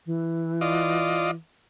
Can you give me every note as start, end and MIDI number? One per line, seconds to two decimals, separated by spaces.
0.05 1.34 52
0.61 1.31 65
0.61 1.31 74
0.61 1.31 75